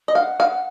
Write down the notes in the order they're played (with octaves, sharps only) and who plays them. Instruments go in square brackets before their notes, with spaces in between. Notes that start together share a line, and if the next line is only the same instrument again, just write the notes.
[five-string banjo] D#5
[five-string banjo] F5 [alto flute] F#5
[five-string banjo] F5